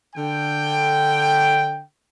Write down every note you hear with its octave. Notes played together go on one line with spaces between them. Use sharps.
D3 G5